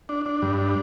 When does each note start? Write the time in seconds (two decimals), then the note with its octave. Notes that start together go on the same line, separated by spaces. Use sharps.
0.09 D4
0.26 D4
0.42 G2
0.58 D4